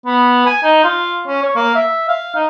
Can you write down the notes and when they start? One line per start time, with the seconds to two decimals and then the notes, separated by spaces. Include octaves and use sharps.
0.06 B3
0.46 G#5
0.64 D#4
0.84 F4
1.28 C#4
1.43 C#5
1.56 A#3
1.75 E5
2.08 F5
2.36 D#4